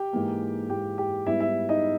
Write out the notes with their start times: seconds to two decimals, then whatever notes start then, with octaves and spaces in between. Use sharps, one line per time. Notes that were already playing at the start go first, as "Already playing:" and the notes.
Already playing: G4 G5
0.13 G#2 E3 A#3
0.69 G#2 E3 A#3 G4 G5
0.98 G4 G5
1.26 G#2 G3 B3 E4 E5
1.40 E4 E5
1.69 D#4 D#5